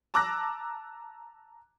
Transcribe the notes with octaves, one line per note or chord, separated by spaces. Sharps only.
A5 A#5 D6 E6 F#6 A#6